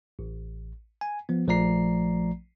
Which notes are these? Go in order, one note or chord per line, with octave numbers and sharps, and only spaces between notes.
A1
G#5
F3 B3
A#1 F3 A3 D5 A#5 C7